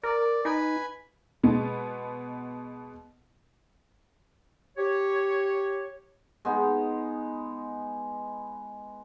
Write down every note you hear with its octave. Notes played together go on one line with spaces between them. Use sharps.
A#4 D5
D#4 B4 G#5 B5
B2 G#3 B3
G4 C#5
G#3 B3 D#4